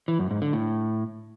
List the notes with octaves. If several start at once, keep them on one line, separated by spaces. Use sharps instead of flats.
E3
F#2
G#2
D3
A2